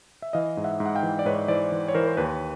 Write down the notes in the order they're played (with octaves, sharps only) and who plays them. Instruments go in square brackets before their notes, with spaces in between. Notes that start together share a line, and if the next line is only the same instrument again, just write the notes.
[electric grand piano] E5
E3 D#5 F5
G#2
E5 F#5
G#2
F#5
F5 G5
E3
D5
G#2 B4 C#5
E3 C5 D5
E3
C#5
E3 A#4 C5
C5
D#2 B4 C#5